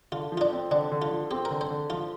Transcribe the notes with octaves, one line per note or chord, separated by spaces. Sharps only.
D3 F4
F3
F4
D4
C4
D3 D4
D3
F4
F3
C4 G4
A#4
D3
C5
D3
F3 F4